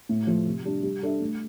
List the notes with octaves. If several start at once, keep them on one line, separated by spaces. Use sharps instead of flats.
A2
F3 A3
C3
G3 D4
G3
D4 A4 E5
A3